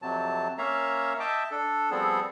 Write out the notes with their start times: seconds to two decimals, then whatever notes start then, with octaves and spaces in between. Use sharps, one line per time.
0.02 F2 C3 F#3 A5
0.58 A#3 C#4 C#5 E5 F5 A#5
1.20 D#5 E5 G5 A5 D6
1.51 D4 A4
1.91 F3 G3 B3 C4 G#4 A4